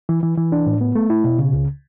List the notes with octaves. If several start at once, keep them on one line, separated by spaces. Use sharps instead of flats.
E3
E3
E3
D4
A2
B3
A3
E4
B2
C#3
C#2